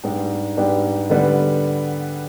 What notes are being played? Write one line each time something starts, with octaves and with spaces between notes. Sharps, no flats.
G#2 G3 B3 D4 G4
G#2 G3 B3 D4 G4
D3 G3 B3